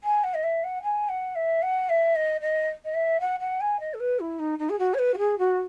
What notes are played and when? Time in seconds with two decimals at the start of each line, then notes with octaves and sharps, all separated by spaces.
0.04 G#5
0.23 F#5
0.34 D#5
0.43 E5
0.64 F#5
0.82 G#5
1.09 F#5
1.35 E5
1.62 F#5
1.89 E5
2.15 D#5
2.41 D#5
2.84 D#5
2.94 E5
3.20 F#5
3.40 F#5
3.60 G#5
3.80 D#5
3.94 A4
4.00 B4
4.20 E4
4.39 D#4
4.59 D#4
4.69 G#4
4.79 F#4
4.94 C#5
4.98 B4
5.14 F#4
5.18 G#4
5.38 F#4